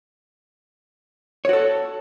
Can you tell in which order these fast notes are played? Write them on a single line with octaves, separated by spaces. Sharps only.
C#5 F#4 A4